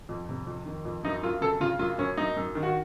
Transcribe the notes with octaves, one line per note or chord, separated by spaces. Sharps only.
F2
C3
F2
D#3
F2
F#2 D#4
F#2 F4
C#3 A4
C#3 F4
F#2 F4
F#2 C#4
F#2 D#4
F#2
D#3
F#4